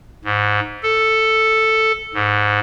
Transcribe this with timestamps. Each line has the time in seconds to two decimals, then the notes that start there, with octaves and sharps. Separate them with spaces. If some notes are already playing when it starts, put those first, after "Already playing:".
0.24 G#2
0.83 A4
2.14 G#2